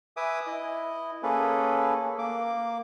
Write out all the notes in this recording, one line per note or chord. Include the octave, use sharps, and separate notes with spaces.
B4 E5 G#5 D6 D#6
E4 D#5
A#3 C#4 G#4 A4 B4
A#3 D6